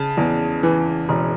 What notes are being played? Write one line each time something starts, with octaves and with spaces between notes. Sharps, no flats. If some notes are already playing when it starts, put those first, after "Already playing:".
Already playing: C#3 A5
E2
E3
E1